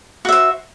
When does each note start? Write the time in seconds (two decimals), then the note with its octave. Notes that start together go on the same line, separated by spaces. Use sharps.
0.25 F#4
0.29 E5
0.32 C5